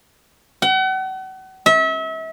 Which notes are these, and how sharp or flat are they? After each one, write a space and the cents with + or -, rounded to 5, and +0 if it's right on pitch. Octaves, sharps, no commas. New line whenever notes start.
F#5 +40
E5 -35